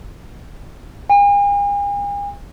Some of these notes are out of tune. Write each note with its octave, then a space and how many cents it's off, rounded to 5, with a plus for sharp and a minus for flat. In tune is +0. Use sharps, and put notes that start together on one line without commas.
G#5 -45